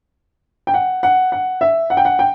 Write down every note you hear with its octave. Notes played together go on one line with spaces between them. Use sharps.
G5
F#5
F#5
F#5
E5
F#5
G5
F#5
G5